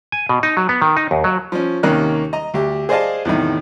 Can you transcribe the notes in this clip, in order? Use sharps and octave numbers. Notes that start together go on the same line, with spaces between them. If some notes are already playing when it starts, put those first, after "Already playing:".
G#5
B2
D#4
F#3
B3
D#3
D#4
D#2
F#3
F3 C#4
D#2 C3 D#3 A#3 C#4 F#6
D#5 A#5
D2 G4
G#4 C5 D5 D#5 F5 A5
E2 A2 C3 D#3